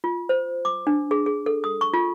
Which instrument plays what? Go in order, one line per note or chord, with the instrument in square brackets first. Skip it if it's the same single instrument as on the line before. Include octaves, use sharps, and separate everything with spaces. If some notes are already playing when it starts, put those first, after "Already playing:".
[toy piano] F4
C5
D6
D4
G#4
G#4
A4
D#6
C#6
F4